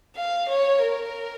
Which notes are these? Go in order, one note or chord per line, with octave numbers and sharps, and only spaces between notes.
F5
C#5
A#4